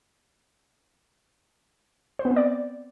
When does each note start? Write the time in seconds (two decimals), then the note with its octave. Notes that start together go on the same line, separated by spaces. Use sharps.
2.19 C5
2.25 B3
2.31 C4
2.36 D5